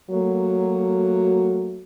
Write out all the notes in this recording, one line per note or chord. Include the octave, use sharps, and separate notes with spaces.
F#3 A3 A#3 F#4